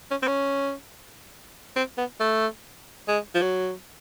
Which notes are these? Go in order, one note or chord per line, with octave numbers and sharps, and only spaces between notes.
C#4
C4
C#4
C4
B3
A3
G#3
F3
F#3